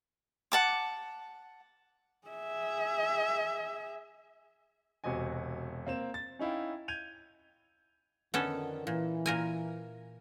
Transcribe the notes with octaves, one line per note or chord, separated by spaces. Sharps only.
F#5 A5 D6
G#4 E5
E1 C3 F#4 D#5 G#5
A#3 C4 E7
A6
C#4 D#4 E4 F5 G5
G6 G#6 D#7 F7
F2 D3 D#3 B3 C#4 A4
A#2 E3
A#2 A#4 G#5